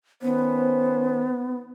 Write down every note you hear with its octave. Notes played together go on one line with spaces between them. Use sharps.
D#3 B3 C#4 C5